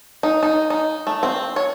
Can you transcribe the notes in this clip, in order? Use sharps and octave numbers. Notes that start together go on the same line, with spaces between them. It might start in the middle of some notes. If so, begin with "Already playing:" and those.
D#4
D#4
D#4
A3
C4
C#5